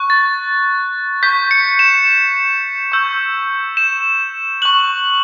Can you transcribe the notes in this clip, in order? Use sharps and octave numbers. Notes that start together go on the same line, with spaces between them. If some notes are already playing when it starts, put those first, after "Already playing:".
Already playing: C#6 F#6
A6
C#6 G6 B6
C#7
E7
C#6 E6 G6
E7
C#6 F#6 F#7